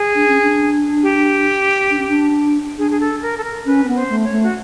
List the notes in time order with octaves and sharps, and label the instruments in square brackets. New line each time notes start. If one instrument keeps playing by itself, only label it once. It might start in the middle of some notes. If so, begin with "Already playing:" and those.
Already playing: [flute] G#4
[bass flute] D4
C#4
D4
[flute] G4
[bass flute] D4
C#4
D4
[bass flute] D4 [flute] G#4
[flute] G#4
A4
A#4
A4
A#4
[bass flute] C#4 [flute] B4
[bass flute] C4
B3
[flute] C5
[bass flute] A3
[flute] C#5
[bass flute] A3
[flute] F#4